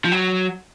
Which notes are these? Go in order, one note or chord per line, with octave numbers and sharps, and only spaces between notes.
F3
F#3